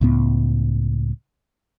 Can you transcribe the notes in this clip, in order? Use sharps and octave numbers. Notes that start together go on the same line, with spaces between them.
C#2 A2 B3